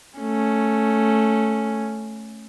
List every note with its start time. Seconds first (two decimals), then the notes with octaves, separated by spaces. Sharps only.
0.19 A3 C#4